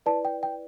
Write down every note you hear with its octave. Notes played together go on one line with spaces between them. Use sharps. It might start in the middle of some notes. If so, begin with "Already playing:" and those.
E4 B4 D5 A5
G5
G5